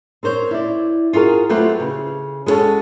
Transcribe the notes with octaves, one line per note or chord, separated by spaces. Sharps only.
C4 A#4 C5 C#5
E4 D5
F4 F#4 G#4 A#4
F#3 A3 C4 F4 G4 B4
C#3
G#3 B3 C#4 F#4 A4